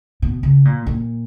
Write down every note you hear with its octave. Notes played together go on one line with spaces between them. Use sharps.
B2
C#3
A#2
A#2